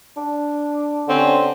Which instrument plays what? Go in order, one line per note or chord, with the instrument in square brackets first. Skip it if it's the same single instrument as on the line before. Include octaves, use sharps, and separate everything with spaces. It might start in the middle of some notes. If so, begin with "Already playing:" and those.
[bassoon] D4
[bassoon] D3 [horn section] C4 C#4 G4